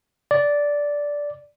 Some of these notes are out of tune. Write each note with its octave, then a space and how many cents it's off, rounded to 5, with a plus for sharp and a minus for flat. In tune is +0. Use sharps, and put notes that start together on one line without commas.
D5 -10